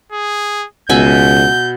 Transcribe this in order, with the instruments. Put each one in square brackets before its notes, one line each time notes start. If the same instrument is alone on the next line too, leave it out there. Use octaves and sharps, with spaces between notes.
[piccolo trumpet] G#4
[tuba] C#2 [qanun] B2 E5 G#5 [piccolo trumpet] G6